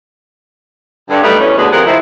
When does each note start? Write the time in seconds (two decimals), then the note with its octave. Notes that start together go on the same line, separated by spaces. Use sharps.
1.10 G2 D3
1.23 F#3 G3 A3 B3 D#4 B4
1.39 E2 E3 G3 C#4
1.57 D2 B2 D3 G#3 B3
1.71 F2 C3 F3 G#4 A#4 F#5
1.86 D#3 F3 G#3 C4 E4 F4